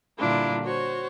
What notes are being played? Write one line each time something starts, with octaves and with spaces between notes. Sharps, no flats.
A#2 D3 G3 D4 E4 F4
F#4 C5 C#5